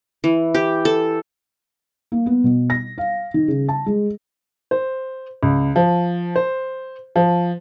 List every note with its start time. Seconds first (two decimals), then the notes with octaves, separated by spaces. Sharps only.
0.24 E3
0.55 G4
0.85 A4
2.12 A#3
2.26 B3
2.44 B2
2.70 A#6
2.98 F5
3.34 D#3
3.48 C#3
3.68 A5
3.86 G#3
4.71 C5
5.43 C#2
5.76 F3
6.36 C5
7.16 F3